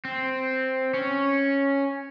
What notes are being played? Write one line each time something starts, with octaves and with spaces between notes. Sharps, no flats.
C4
C#4